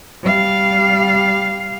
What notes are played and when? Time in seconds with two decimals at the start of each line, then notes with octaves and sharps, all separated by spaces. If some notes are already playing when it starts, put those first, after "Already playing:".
0.23 G3 F5